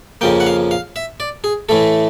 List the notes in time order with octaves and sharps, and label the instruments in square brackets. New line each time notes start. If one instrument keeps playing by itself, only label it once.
[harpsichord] F2 C#3 F3 A#3 G5
F#5
F5
F5
E5
D5
G#4
A2 E3 A3 A4